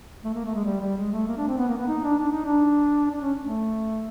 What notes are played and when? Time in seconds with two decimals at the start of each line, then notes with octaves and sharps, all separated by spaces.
0.24 A3
0.34 A#3
0.45 A3
0.55 G#3
0.65 G3
0.80 G3
0.97 G#3
1.12 A3
1.28 A#3
1.37 D4
1.48 C4
1.57 B3
1.68 A#3
1.78 B3
1.88 D#4
2.04 D4
2.19 D4
2.32 D#4
2.45 D4
3.11 D4
3.22 C#4
3.42 A3